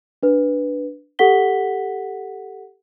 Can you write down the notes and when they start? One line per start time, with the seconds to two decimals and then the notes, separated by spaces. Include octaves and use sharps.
0.23 D4 B4
1.19 G4 A4 F#5 B6 G7